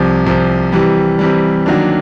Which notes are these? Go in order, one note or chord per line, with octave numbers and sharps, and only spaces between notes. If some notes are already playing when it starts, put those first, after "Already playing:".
Already playing: C2 C3 F3
C2 C3 F3
C3 E3 G3
C3 E3 G3
D#3 F#3 A#3 D4